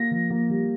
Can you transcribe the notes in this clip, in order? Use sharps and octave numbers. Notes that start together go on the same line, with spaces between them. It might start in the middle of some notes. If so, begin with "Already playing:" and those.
Already playing: A#3 A#6
F3
A#3
G3